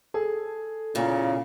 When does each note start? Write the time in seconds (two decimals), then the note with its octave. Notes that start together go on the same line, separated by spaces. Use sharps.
0.14 G#4 A4
0.95 E2 A#2 C#3